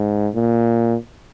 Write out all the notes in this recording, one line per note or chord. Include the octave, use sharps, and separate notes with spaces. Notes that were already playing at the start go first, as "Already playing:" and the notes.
Already playing: G#2
A#2